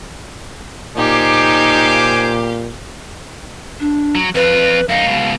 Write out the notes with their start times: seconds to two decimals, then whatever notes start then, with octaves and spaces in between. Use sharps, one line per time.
0.97 A#2 D#4 G4 C5 F5 G#5 D6
3.80 D4
4.15 F#3
4.35 F2 F4 B4
4.89 F#2 D#4 F5
5.06 C#2 B2